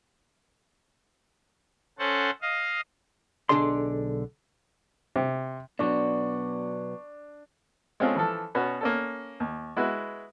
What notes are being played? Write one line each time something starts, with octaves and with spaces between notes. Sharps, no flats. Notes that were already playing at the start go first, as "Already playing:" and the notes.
C#4 A4 C5 F#5 A5
D#5 F5
B1 D3 D4 G#4 D5 C6
C3
B2 F#3 B3 D4 D5 C#6
G#3 C4 C#4 F4 G#4 A4
E3 F3 A4
B2 B3 C#4 F#4
A#3 C#4 A4
D#2
G#3 E4 F#4 B4